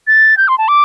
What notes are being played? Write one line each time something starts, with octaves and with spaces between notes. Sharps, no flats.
A6
G6
C6
A5
D6